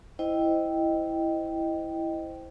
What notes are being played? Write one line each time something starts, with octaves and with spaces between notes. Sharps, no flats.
E4 C5 D#5 G5